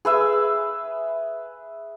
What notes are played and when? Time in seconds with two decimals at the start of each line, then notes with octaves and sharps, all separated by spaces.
0.05 G#4 B4 E5